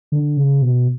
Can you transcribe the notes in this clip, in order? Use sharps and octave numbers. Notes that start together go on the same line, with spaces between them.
D3
C#3
B2